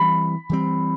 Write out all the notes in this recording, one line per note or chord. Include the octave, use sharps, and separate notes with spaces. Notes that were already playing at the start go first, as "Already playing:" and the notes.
Already playing: E3 G3 C4 B5
E3 G3 C4